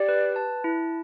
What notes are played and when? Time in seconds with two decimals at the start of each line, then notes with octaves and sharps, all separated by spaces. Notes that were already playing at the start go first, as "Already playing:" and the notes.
Already playing: G4 D5
0.09 B4
0.36 A5
0.64 E4